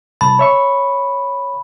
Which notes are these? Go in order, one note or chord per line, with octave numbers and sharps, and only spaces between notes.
C2 A5 B5
C#5 E5 C#6